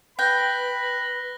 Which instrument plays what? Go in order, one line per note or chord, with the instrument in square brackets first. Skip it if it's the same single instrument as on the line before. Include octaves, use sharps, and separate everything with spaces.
[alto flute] B4 [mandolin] G5 [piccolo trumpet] B5 [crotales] F#6 A#6 G7